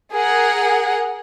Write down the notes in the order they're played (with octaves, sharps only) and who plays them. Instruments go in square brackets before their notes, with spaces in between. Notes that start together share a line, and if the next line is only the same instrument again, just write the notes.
[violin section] G#4 A#4 F#5